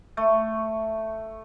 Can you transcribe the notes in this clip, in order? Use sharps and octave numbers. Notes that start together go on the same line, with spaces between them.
A3